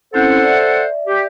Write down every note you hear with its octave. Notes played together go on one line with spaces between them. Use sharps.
C4 C#4 E4 A4 C5 F#5
D5 E5
G4